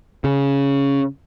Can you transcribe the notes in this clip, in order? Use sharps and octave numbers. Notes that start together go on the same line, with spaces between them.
C#3